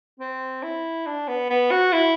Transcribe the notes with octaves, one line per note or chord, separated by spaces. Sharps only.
C4
E4
D4
B3
B3
F#4
E4